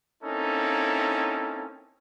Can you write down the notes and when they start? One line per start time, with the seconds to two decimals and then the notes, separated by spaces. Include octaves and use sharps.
0.23 A#3 C4 C#4 D#4 E4 A4